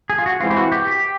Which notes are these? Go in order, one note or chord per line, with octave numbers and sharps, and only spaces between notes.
G#4
F4
F#4
E3 G#3 C4 E4 F4
G4
F#4
G4
G4